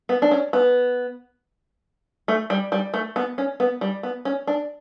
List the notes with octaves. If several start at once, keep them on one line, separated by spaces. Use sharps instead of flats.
B3
D4
C#4
B3
A3
G3
G3
A3
B3
C#4
B3
G3
B3
C#4
D4